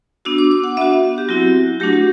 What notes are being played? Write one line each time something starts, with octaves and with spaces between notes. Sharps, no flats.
B3 D4 F#4 E6
D6
D6
F#5
B3 D4 F#4 E5
G4
F#3 C4 E4 F#4
F#3 A3 D4 F#4 G4
F#4